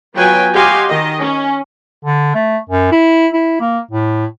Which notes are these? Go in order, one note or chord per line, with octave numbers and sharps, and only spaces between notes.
F#3 B3 F4 B4 G5 G#5
F#4 G4 D#5 F5 G#5 C6
D#3 D#5
C#4
D3
A3
F#2
E4
E4
A#3
A2